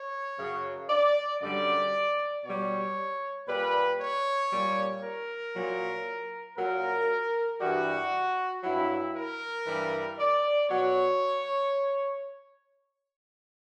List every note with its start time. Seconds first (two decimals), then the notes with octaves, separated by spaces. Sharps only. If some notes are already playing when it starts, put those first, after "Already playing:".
Already playing: C#5
0.38 F#2 C#3 F#3
0.89 D5
1.41 F#2 D3 G3 D5
2.44 B2 G3 C#5
3.47 A#2 G3 B4
3.99 C#5
4.50 A#2 G3
5.02 A#4
5.54 A#2 F#3
6.57 A#2 F#3 A#4
7.60 G2 E3 G3 F#4
8.63 G2 F#3 E4
9.15 A#4
9.67 G2 E3 G3
10.19 D5
10.69 B2 F#3 C#5